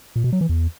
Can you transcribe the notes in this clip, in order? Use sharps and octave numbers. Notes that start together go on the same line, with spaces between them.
A#2
B2
F#3
E3
E2